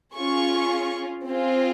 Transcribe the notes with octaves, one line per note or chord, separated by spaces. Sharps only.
C#4 F4 G#4 C#6
C4 F4 G#4